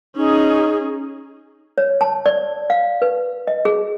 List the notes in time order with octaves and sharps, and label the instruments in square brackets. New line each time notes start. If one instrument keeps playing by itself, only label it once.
[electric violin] C#4 G#4 [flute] D#4
[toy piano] C#5
A5
D5
F5
B4
D#5
G#4